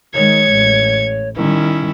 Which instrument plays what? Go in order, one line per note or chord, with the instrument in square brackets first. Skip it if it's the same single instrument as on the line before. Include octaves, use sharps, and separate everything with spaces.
[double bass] D#3 G#3 [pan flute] C#5 [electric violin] G#6 C#7
[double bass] A1
[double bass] D#3 G3 [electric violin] C#4 E4